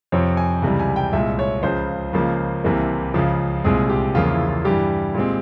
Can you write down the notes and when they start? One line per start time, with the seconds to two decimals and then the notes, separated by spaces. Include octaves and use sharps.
0.12 F2 C3 F3 C4 C#5
0.37 G#5
0.62 C#2 C3 E3 G3
0.80 G#5
0.96 G5
1.13 C2 A#2 G#3 E5
1.39 C#5
1.63 C#2 C#3 F3 C5
2.13 C#2 C#3 F3 A#3
2.64 C2 C3 E3 A#3
3.14 C#2 C#3 F3
3.64 C2 A#2 G#3 C4 G#4
3.89 G4
4.15 E2 C#3 F3 A#3 F4
4.32 E4
4.48 F4
4.65 G2 E3 G3 G4
5.14 A#2 G#3 C4